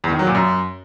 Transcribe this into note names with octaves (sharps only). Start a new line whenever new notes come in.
E2
D#3
F#3
A#2
F#2